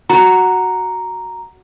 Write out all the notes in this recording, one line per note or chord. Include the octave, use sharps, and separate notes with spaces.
F#4 A#5